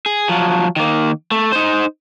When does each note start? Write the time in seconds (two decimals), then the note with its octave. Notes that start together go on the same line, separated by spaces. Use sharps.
0.06 G#4
0.29 F3 F#3
0.76 D#3 A#3
1.31 A3
1.52 D#4 C5